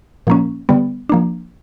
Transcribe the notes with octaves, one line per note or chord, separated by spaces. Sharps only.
A#2 F3 A#3 C#4
D3 G3 B3
F3 A#3 D4